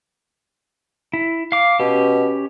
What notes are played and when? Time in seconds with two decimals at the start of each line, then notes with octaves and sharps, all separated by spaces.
1.14 E4
1.52 F5 D6
1.80 B2 C#4 G4